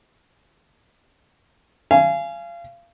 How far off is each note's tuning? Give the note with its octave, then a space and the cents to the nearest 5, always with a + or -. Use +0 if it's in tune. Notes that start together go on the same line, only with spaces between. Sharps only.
F5 -30 G#5 +5